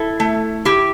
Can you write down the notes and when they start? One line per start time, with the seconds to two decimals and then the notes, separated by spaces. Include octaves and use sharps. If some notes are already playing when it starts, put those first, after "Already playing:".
Already playing: E4 A4
0.20 A3
0.65 E4 G4